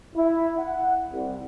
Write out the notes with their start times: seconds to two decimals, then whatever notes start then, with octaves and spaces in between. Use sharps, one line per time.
0.16 E4
0.58 F#5
1.10 C2